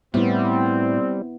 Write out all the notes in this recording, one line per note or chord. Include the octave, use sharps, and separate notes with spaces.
A2 G3 B3 C4 E4